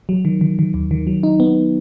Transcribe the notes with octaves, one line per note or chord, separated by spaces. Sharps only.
F#3
D#3
D#3
D#3
D#2
D#3
F#3
D#4
B3